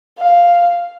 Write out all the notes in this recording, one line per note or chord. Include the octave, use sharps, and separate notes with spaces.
F5